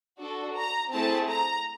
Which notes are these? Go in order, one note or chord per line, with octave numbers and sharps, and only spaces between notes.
D4 F#4 A4
A#5
A3 C4 E4 G#4 A5
A#5